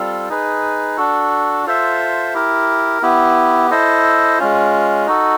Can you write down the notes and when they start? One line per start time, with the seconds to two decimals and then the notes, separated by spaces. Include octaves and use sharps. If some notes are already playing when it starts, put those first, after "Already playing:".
Already playing: G3 C4 F4 A4
0.29 D#4 G#4 B4
0.97 D4 F#4 A4
1.66 F4 A4 C5 E5
2.34 E4 G4 A#4
3.02 B3 E4 G4
3.71 E4 A4 C5 D#5
4.39 G#3 C#4 F4
5.07 D#4 F#4 A4